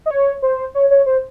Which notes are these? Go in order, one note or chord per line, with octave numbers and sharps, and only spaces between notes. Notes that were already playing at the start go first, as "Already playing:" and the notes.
D#5
C#5
C5
C#5
C#5
C5